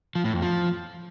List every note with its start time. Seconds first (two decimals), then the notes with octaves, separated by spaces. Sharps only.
0.15 F3
0.24 A2
0.33 F2
0.42 F3